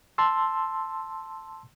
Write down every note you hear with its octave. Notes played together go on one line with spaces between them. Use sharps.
A5 C6 E6